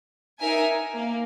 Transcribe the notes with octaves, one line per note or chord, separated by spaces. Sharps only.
D#4 A#4 E5 G#5
A#3